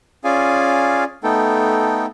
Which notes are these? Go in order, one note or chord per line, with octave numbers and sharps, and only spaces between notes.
C#4 F4 G#4 D5 F5 G#5
A3 B3 D#4 A4 G5